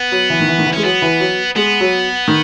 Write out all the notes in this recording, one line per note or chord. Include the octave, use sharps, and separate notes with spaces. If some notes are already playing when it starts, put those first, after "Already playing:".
Already playing: B3
F#3
E3
D#3
E3
D#3
E3
G#3 C#4
F#3 B3
E3
F#3
G#3 B3
F#3
D#3